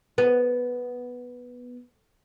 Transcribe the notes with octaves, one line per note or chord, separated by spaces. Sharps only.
B3